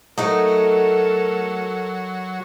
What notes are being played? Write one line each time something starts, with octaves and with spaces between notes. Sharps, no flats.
F#3 A3 D#4 F#4 A4 A#4